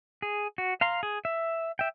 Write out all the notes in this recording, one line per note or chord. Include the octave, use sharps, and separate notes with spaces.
G#4
F#4
F5 A#5 C6
G#4
E5
E5 G5